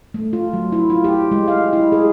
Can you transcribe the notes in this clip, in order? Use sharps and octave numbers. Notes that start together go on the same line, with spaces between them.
A3
F4
F#3
E4
F4
G4
G#3
F5
E4
G#4